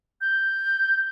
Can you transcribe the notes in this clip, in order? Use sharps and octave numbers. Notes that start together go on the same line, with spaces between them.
G6